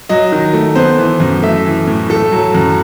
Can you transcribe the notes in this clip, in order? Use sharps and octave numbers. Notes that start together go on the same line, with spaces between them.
F#3 D#5
D#3
A3
B3 C5
E3
F#2
A3 E5
E3
A2
A3 A4
F#3
F#2